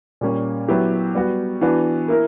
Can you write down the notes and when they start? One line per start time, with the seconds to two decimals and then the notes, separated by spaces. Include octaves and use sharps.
0.21 A#2 G3 A#3 C#4
0.68 F#3 B3 E4 G4
1.15 G3 B3 F#4
1.61 E3 B3 D4 F#4
2.08 A#3 E4 A#4